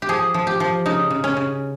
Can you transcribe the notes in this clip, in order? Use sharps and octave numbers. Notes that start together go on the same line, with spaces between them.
G4
F3 G#4
F3
G4
F3
C#3 D#4
C#3
C#4
C#3